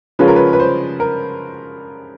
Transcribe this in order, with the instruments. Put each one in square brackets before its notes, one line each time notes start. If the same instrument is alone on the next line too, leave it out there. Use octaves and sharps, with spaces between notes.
[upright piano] C#3 F3 G#3 C#4 F4 B4
A#4
B4
B4
C5
A#4